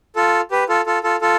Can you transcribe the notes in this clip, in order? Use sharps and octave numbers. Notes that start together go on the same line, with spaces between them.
F4 A4
G4 B4
F4 A4
F4 A4
F4 A4
F4 A4